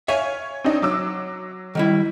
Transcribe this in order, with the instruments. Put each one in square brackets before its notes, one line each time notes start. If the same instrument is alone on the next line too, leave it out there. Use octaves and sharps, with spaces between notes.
[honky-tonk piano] C#5 [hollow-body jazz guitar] E5 F5 G#5
[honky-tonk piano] C4 D4 D#4
F#3 D6 E6
[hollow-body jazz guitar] D#3 G3 E4